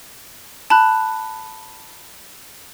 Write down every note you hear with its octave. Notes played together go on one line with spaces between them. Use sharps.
A5 B5 F#6